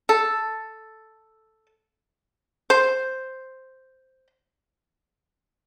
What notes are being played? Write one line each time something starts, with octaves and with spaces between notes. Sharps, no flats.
A4
C5